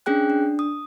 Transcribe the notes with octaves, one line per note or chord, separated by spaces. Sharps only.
C#4 D4 G#4 G5 F#6
D4
D#6